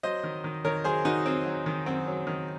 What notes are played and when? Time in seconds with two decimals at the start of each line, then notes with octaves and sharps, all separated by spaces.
0.03 F#3 C5 D#5
0.24 D#3
0.44 D#3
0.65 D#3 A#4 C#5
0.84 F#3 G#4 C5
1.05 D#3 D#4 F#4
1.26 F#3 C4
1.46 F#3
1.66 D#3
1.86 F#2 C4
2.07 F#3
2.27 D#3